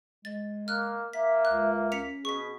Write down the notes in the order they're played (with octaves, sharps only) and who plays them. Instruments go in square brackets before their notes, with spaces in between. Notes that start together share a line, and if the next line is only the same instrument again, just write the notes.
[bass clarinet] G#3 [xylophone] A6
[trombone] A#3 [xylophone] F6 F#6
[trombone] A#3 [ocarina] E5 [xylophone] B6
[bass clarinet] C#2 [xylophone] F#6
[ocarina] C#4 [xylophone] B6 C#7 F7
[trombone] B2 [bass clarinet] G#4 [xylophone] C#6 B6